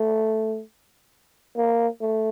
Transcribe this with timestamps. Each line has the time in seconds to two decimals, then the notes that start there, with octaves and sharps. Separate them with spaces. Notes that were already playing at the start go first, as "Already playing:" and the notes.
Already playing: A3
1.57 A#3
2.01 A3